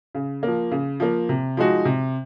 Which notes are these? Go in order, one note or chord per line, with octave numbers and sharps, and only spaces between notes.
C#3
F3 A#3
C#3
F3 A#3
C3
F3 G#3 D#4 F#4
C3